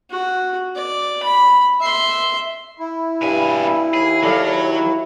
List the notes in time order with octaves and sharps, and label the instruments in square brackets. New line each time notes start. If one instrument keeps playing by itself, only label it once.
[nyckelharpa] F#4
D5
B5
E5 C6
[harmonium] E4
[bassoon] G2 [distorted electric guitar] B2 G#5
[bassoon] D#2 [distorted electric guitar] G#4
[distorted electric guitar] F#3 [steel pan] A4 D5 F5